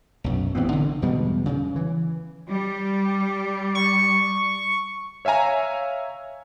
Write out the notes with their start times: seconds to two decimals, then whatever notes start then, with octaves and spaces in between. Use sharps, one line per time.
0.24 B1 F#2
0.55 A1 E3 B3 C4
0.72 D3
1.02 E2 B2 G3 G#3
1.46 C#3
1.76 E3
2.49 G3
3.75 C#6
5.25 C#5 E5 F5 G#5 A#5